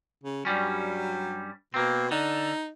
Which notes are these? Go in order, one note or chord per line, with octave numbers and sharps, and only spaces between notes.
C#3
G2 F#3 G3 C#4
B2 A#3 C4
D3 D#4